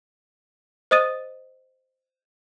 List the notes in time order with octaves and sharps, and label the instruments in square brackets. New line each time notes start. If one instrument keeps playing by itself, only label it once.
[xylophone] C5 D#5 D#6 A6 D#7